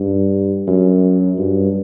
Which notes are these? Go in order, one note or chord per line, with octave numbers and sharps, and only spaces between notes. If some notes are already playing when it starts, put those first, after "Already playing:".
Already playing: G2
F#2
G2